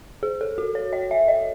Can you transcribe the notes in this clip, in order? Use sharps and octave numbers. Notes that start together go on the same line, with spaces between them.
G#4
A4
F#4
C#5
D#5
E5
D#5